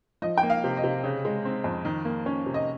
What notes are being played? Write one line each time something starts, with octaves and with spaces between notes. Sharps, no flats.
F3 D#5
G5
A#3
F5
C3
D#5
C3
C#3
G#3
C4
F2
D#3
A#3
C#4
C3
D#5